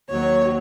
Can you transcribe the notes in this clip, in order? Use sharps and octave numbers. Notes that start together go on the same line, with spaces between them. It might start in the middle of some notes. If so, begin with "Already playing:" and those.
D#2 D#3 F#3 C#5